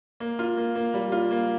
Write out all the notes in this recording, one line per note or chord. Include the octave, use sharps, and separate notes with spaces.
A#3
F4
A#3
A#3
G3
F4
A#3